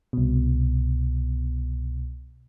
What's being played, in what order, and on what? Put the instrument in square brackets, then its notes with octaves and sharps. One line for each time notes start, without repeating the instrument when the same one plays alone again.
[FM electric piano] C2 B2